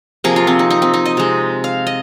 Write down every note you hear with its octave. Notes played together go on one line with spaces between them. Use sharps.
C3 F3 A#3 G#4
F4
C4
D#4
D#4
C4
D#4
D#5
C3 G#3
F5
D#5